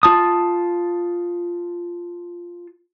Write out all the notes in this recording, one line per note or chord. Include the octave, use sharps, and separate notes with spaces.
F4 A5 D#6